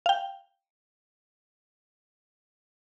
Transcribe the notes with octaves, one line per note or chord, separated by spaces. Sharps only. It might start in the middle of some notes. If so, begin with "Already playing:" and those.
F5 G5